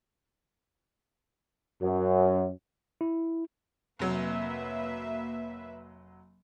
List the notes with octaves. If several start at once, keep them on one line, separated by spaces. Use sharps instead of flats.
F#2
E4
F1 F#3 A#3 B4 E5